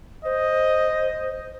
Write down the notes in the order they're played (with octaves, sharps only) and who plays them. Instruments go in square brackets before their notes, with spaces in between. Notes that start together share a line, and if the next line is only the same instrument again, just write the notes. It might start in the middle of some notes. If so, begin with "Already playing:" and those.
[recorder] C5 [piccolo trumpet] D#5